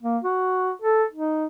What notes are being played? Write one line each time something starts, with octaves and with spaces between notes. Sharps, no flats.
A#3
F#4
A4
D#4